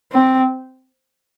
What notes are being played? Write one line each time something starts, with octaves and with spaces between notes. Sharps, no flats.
C4